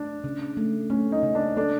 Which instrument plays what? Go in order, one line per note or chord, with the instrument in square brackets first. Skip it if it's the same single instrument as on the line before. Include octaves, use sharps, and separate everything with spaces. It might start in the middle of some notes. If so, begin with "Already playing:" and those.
Already playing: [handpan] A3 [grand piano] D4
[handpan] C#3
A3
[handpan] A3 [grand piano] C#4
[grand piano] D#4
[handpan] C#3
[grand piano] D4
[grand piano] D4 [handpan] A4